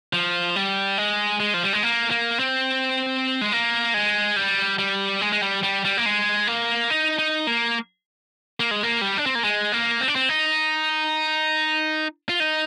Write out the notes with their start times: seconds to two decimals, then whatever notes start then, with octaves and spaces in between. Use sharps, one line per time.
0.13 F3
0.56 G3
0.98 G#3
1.40 G#3
1.54 F3
1.64 G3
1.73 G#3
1.83 A#3
2.11 A#3
2.39 C4
3.41 G#3
3.52 A#3
3.94 G#3
4.36 G3
4.79 G3
5.21 G#3
5.32 G#3
5.42 G3
5.63 G3
5.85 G3
5.98 A#3
6.06 G#3
6.47 A#3
6.90 D#4
7.19 D#4
7.47 A#3
8.60 A#3
8.71 G#3
8.83 A#3
9.01 G3
9.18 D4
9.26 C4
9.35 A#3
9.44 G#3
9.72 A#3
10.01 C4
10.08 D4
10.15 C4
10.29 D#4
12.29 F4
12.40 D#4